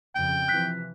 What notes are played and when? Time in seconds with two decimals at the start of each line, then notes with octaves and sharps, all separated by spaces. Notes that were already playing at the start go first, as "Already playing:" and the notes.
0.15 F2 C#3 G5
0.48 C3 E3 F3 F#6 B6